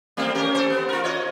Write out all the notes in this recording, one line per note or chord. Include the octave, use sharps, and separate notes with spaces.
G3 A3 C4
C#4 G4 A#4
A4 C5
B3
F4 A#4
C#5 D#5